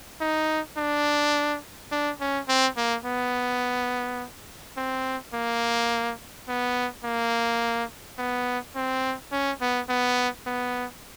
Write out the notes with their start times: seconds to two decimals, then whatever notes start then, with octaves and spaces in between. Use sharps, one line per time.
0.20 D#4
0.77 D4
1.91 D4
2.20 C#4
2.48 C4
2.77 A#3
3.05 B3
4.77 C4
5.33 A#3
6.48 B3
7.04 A#3
8.19 B3
8.75 C4
9.32 C#4
9.61 B3
9.89 B3
10.46 B3